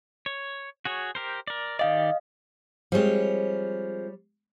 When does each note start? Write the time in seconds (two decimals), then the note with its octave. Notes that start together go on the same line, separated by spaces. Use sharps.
0.26 C#5
0.85 F#4 G#4 C#5
1.15 G4 A#4 C5
1.47 A#4 D5
1.79 D#3 G4 D5 D#5 F5
2.92 F3 G3 G#3 C4 C#5